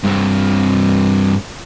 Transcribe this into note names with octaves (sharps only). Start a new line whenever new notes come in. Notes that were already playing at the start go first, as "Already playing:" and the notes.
G2 C4